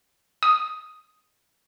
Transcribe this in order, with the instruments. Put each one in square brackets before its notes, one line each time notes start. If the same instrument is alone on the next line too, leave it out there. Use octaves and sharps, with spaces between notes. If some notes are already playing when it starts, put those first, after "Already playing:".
[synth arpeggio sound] D#6